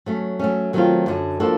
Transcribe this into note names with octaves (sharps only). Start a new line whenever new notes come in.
F#3 A3 C#4
F#3 A3 C#4
D#3 F#3 A3 C4 F4
F#2 D3 F#3
F3 A#3 D4 F#4 A4